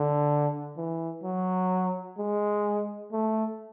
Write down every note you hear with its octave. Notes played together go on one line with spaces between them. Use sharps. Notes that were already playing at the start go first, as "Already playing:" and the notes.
Already playing: D3
E3
F#3
G#3
A3